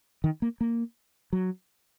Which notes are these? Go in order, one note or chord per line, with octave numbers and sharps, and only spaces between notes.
D#3
A#3
A#3
F#3